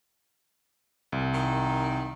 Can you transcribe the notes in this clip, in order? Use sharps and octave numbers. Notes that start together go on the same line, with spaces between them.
C2
D#3